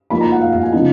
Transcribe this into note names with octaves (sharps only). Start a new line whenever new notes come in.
F3 A#3 D#4 B5
A#5
F#5
F5
F5
G#5
C#3 F3 B3 D#4